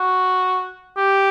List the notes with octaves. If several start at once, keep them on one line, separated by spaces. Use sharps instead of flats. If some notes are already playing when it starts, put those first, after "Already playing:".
Already playing: F#4
G4